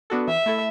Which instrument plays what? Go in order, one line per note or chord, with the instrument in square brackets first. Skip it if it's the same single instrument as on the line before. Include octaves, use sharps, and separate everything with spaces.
[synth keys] B3 D4 F#4 A4
[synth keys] E3 [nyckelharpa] E5
[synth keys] A3 E4 A4